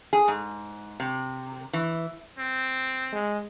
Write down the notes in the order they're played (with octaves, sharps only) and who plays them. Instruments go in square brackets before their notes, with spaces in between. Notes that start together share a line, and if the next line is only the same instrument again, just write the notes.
[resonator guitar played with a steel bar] G#4
G#2
C3
E3
[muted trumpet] C4
[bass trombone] G#3